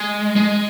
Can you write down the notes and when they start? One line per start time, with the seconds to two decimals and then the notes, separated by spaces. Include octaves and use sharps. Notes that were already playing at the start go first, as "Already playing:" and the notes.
Already playing: G#3
0.36 G#3